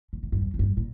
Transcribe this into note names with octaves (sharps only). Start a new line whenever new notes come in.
A#2
A2
G2
F2
F2
G2
A#2